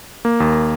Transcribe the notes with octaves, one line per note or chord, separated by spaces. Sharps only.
A#3
D#2